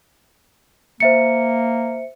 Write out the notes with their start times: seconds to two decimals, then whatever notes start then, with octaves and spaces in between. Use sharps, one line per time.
1.00 A#3 C5 E5 C#7